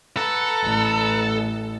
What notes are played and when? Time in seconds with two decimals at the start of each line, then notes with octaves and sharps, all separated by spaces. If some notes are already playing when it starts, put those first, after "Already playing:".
0.17 A4 B4 F#5 A#5
0.63 A1